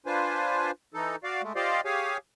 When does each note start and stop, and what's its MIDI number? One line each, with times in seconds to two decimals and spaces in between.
0.06 0.71 62
0.06 0.71 65
0.06 0.71 71
0.06 0.71 72
0.06 0.71 80
0.94 1.16 52
0.94 1.16 63
0.94 1.16 69
1.24 1.42 66
1.24 1.42 74
1.24 1.42 77
1.43 1.53 56
1.43 1.53 57
1.56 1.81 65
1.56 1.81 67
1.56 1.81 72
1.56 1.81 74
1.56 1.81 75
1.56 1.81 77
1.85 2.17 67
1.85 2.17 68
1.85 2.17 73
1.85 2.17 77
1.85 2.17 80